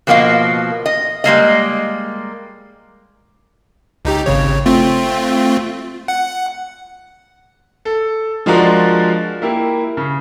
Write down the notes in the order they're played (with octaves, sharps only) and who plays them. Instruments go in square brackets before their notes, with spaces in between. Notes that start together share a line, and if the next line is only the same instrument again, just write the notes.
[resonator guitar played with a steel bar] B2 F3 A#3 F#4 D#5 F5
D#5
G3 G#3 A#3 D#5
[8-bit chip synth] C#2 D#4 G4
G#1 C#3 C#5
A3 C4 F4
F#5
[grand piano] A4
F3 G#3 D4 F4 F#4 A#4
A#3 E4 G4
C#3